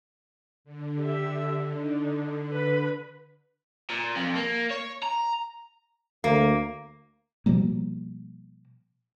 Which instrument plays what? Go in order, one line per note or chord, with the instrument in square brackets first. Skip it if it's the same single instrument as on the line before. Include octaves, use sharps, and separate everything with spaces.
[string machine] D3
[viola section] G4 E5
D4 D#4
B4 B5
[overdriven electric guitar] A#2
F2
A#3
C#5
A#5
[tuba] D2 [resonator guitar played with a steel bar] A#3
[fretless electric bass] B2 F3 G3 A#3